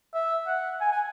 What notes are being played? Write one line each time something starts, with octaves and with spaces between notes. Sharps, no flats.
E5
F#5
G#5
G#5